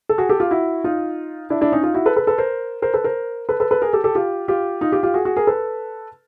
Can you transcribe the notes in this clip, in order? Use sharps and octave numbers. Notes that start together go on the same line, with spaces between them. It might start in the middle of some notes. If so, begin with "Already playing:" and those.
A4
F#4 G#4
G4 A4
F4 G4
E4 F#4
D#4 F4
D4 E4
D4 E4
C#4 D#4
D#4 F4
E4 F#4
A4 B4
A4 B4
A4 B4
A#4 C5
A#4 C5
A4 B4
A#4 C5
A4 B4
A4 B4
A4 B4
G#4 A#4
G4 A4
G4 A4
F4 G4
F4 G4
D#4 F4
F4 G4
F4 G4
F#4 G#4
F#4 G#4
G#4 A#4
A4 B4